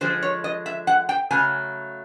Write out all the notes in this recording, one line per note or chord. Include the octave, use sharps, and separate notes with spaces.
D3 F3 G#3 C5
C#5
D#5
E5
F#5
G5
C#3 F#3 A3 G#5